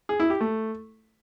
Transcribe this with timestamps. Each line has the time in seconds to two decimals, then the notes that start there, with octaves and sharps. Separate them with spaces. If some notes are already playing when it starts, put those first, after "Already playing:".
0.09 G#4
0.20 E4
0.30 G4
0.41 A3